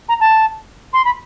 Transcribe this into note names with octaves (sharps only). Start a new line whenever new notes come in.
A#5
A5
C6
B5